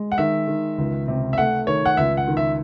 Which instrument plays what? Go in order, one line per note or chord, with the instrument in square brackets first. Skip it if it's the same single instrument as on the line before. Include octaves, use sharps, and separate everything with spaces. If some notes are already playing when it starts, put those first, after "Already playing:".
Already playing: [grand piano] G#3
[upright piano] F#5
[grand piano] D#3 [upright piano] E5
[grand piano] D#3
C#2
C3
[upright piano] E5
[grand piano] A3 [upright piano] F#5
[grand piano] D#3 [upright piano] C#5
[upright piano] F#5
[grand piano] C#2 [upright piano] E5
[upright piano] F#5
[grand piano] D#3
[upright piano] E5